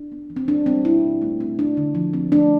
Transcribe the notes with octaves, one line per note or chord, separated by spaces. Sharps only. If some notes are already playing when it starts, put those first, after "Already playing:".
Already playing: D4
B3
E3
C4
G3 D4
G3 C4
B2 E4
B2
A3
C4
C4 D4
D3
F3
C4
A3 D4